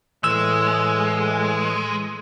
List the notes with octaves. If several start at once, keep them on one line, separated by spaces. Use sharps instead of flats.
A2 E3 G#3 E6